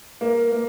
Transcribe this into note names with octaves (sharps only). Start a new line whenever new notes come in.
A#3
A#3